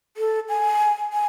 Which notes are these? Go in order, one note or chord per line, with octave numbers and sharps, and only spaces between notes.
A4
G#5
G#5